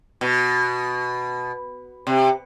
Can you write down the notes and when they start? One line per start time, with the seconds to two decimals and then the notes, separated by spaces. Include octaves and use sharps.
0.21 B2
2.07 C3